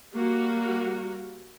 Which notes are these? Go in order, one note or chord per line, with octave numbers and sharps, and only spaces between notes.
G3 A#3 F#4